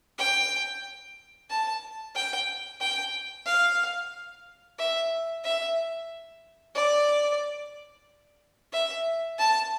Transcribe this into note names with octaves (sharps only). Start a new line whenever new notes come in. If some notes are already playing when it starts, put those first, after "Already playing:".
G5
A5
G5
G5
F5
E5
E5
D5
E5
A5